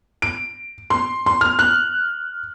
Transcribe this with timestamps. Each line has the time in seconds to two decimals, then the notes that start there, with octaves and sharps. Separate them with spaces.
0.22 D7
0.90 C6
1.26 C6
1.41 F6
1.59 F#6